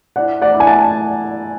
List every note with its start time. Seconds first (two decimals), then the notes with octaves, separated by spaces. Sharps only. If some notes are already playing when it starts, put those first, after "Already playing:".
0.16 E4 D5 F#5
0.42 D5 F#5
0.54 E4
0.60 G#5
0.67 F#5 A5